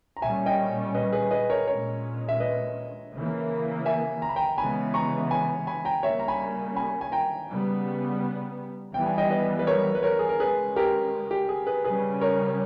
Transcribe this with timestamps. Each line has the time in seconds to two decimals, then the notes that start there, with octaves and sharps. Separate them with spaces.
0.17 A#5
0.22 A#2 G3 C#4 E5 G#5
0.46 D#5 G5
0.94 B4 D#5
1.12 G#4 B4
1.31 B4 D#5
1.50 A#4 C#5
1.67 A#2 G#3 C#4 A#4 C#5
2.29 E5
2.40 B4 D#5
3.13 C#3 E3 A#3
3.86 E5 G#5
4.22 A#5
4.29 B5
4.36 G5 A#5
4.58 C#3 E3 G#3 B3 G#5 B5
4.94 A#5 C#6
5.31 G#5 B5
5.67 G#5 B5
5.85 G5 A#5
6.03 C#3 G3 A#3 C#4 C#5 E5
6.19 A#5
6.28 G#5 B5
6.76 G#5 B5
7.01 G#5
7.12 G5 A#5
7.49 C#3 G3 B3
8.94 E3 G3 B3 G5
9.06 G#5
9.18 D#5 G5
9.30 B4 D#5
9.59 B4
9.67 A#4 C#5
9.95 B4
10.03 A#4 C#5
10.19 G#4
10.29 A#4
10.39 C#3 G#3 C#4 G#4 B4
10.76 G4 A#4
11.31 G4
11.49 G#4
11.67 G#4 B4
11.84 C#3 G3 C#4 G#4 B4
12.21 A#4 C#5